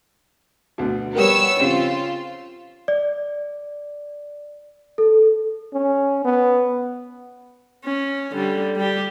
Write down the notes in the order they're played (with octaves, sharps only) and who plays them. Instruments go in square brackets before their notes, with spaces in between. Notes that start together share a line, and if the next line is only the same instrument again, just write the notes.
[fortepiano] D2 B2
[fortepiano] G3 G4 A#4 [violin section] B3 C#5 E6
[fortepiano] C#3 C4 G4 [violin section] F4
[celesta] D5
A4
[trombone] C#4
B3
[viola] C#4
D3 G3
G3 G4